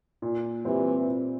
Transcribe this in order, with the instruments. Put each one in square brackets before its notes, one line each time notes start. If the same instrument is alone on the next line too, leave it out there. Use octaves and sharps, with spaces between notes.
[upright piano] A#2
[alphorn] E3 [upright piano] G3 C4
[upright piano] A#2